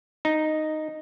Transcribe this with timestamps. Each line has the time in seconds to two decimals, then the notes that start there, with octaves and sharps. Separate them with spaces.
0.25 D#4